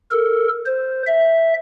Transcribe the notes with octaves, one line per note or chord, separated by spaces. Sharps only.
A4 A#4
C5
E5